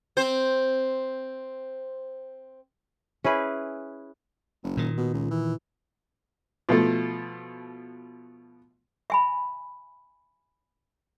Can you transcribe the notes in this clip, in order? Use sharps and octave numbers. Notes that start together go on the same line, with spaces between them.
C4 C5
C#4 E4 G#4 B4
F#1
A#2 D#3
B2
C#2
E3
B2 F3 A3
E5 G#5 B5